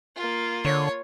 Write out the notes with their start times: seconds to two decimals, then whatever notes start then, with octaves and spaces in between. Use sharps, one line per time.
0.16 A#3 F4
0.65 D3 C#5